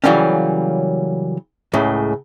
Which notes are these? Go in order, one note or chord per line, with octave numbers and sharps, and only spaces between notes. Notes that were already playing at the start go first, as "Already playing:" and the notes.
C#3 E3 F#3 G3 A#3 C#4
C#2 A2 C#3